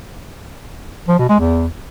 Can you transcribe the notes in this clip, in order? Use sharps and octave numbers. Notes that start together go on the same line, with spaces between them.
F3
B2
G#3
E2